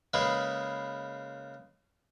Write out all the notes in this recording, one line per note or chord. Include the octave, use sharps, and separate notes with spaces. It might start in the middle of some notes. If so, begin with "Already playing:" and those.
C#3 G#3 A#3 B4 B5